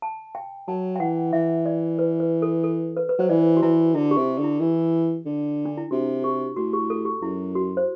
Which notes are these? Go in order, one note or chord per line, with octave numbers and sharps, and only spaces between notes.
A5
G5
F#3 A5
G5
E3 F#5
E3 E5
D5
B4
B4
A4
A4
B4
B4
F#3 C5
E3 D5
F#4
E3 E4
D3 E4
G4
C3
D3
E4
E3
D3
D4
E4
C3 F#4
G4
A2 F#4
G4
A4
G4
F#2 E4
F#4
C5